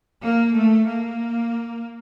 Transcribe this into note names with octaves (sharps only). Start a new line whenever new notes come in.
A#3
A3
A#3